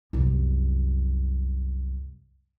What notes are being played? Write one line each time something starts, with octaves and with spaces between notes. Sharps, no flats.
C2 F#2